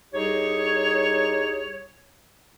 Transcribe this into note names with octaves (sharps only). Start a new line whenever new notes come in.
C2 D#4 G4 G#4 C#5